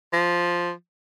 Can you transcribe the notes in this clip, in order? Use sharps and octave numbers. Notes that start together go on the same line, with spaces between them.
F3